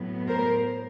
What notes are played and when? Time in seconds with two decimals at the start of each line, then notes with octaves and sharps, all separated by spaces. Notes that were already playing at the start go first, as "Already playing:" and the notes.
Already playing: A2 F#3 B3
0.27 A#4 C5